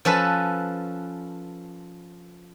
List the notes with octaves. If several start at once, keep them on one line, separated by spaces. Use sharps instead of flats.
F3 C#4 A4 B4